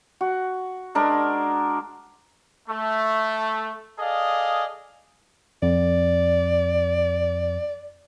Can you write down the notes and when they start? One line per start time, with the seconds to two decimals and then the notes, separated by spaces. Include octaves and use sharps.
0.21 F#4
0.95 G#3 D4 A#4
2.69 A3
3.99 G#4 A4 D5 D#5 F5
5.62 F2 D5